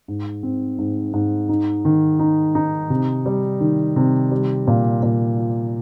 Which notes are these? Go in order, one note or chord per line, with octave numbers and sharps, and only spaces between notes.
G#2
C4
G#2
G#2
D#4
D#3
D#4
D#4
C3
G3
D#3
C3
G3
A#2
A#2
F4